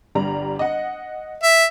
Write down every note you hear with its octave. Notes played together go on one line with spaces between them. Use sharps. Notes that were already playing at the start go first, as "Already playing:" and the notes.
G1 G3 A#5
D#5 F#5
E5